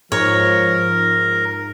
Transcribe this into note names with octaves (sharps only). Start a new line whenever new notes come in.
G#2 F3 A#4 C#5